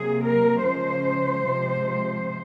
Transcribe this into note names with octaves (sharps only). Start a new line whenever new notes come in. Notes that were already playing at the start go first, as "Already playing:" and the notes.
Already playing: C3 F#3 A#3 G#4
A#4
C#3 F3 G#3 C5
C3 F3 G#3